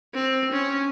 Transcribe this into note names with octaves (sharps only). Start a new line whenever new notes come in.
C4
C#4